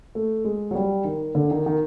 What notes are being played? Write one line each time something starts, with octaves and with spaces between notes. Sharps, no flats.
A3
G#3
F#3
G3
D#3
D3
D#3
D#3